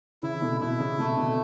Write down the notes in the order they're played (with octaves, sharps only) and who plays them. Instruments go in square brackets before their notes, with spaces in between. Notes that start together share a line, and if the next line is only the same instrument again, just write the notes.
[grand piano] C#3 E3 [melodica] E4
[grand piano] B2 D3
[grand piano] B2 [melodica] E4
[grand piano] C#3
[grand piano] B2 [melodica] A3
[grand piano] B2 D3